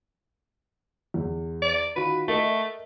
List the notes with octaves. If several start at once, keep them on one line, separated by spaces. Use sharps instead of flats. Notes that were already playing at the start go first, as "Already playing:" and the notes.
E2
D5
D#3 F4 F#4 B4
A3 A#4 D#5 E5